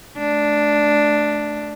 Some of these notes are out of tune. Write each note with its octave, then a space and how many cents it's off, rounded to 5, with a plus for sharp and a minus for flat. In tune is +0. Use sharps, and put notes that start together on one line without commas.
A3 -25 D4 +0